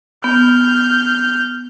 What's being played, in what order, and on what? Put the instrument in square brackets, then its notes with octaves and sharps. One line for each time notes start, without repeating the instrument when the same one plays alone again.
[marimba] B3 [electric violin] F6 G6